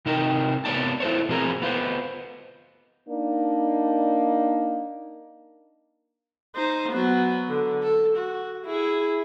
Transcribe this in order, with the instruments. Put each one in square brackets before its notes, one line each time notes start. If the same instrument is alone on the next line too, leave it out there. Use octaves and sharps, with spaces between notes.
[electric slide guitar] C3 D#4 A#4 G5
C3 G3 B3 C#5 D5 A5
E4 A4 C5 C#5
B2 F3 C4 G#4 A#4
B3 F4 C5
[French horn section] A#3 D4 D#4
[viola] D#4 C5
F#3 B3
D3
A4
F#4
E4 G#4